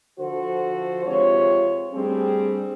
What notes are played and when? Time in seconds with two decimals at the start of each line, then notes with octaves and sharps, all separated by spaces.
0.19 D3 F3 F#4 A4 C5
1.06 F2 C3 G#3 F4 C#5
1.94 G3 A3 C4 D4 G4 G#4